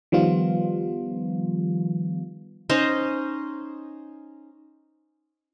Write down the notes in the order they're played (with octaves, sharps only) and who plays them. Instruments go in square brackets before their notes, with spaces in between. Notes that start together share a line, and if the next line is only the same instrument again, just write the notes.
[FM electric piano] D#3 F3 G3 B3 F4
[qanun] C#4 D#4 C5 D#5